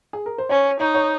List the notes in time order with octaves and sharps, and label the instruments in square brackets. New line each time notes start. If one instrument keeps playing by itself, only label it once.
[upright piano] G#4
A#4
C5
[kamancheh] C#4 [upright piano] C#5
[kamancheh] D#4 [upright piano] C#5
[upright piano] C#5